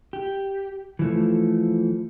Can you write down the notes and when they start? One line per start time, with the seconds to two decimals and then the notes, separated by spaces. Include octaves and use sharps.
0.13 G4
0.99 E3 F3 A3